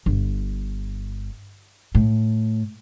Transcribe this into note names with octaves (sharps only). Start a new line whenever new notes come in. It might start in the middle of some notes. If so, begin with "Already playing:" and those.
G1
A2